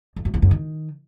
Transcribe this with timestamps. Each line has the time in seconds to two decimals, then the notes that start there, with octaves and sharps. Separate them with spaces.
0.16 F2
0.25 F#2
0.34 E2
0.42 F#2
0.51 D#3